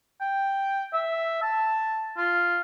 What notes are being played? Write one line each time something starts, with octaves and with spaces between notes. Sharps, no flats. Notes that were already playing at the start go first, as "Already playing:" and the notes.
G5
E5
A5
F4